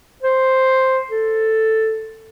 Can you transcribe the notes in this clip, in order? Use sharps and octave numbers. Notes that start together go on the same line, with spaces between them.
C5
A4